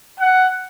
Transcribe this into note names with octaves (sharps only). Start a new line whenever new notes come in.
F#5